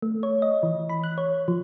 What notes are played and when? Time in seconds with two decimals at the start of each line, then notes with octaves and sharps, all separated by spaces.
0.02 A3
0.23 C#5
0.42 D#5
0.63 E3
0.89 B5
1.04 F#6
1.18 C#5
1.48 F3